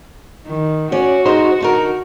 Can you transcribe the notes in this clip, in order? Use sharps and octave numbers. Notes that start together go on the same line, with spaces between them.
D#3
C#4 F#4 D5
G#3 D#4 C5
D3 D#4 A#4